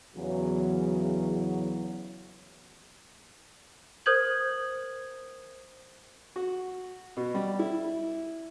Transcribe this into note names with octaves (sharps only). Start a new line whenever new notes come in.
E2 C#3 E3 F#3
A#4 C5 D#6 G6 G#6 F#7
F#4
B2
G3
E4